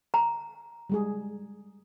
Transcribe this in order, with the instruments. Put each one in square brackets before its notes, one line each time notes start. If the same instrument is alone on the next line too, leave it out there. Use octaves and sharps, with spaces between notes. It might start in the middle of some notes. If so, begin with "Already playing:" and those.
[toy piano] A#5
[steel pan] G3 G#3 G#4